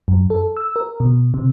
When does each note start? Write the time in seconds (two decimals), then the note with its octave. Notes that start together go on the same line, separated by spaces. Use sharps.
0.08 F#2
0.30 A4
0.57 E6
0.76 A#4
1.00 B2
1.34 C3